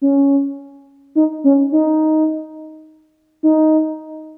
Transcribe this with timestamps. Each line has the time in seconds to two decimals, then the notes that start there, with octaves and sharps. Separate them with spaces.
0.02 C#4
1.15 D#4
1.44 C#4
1.72 D#4
3.43 D#4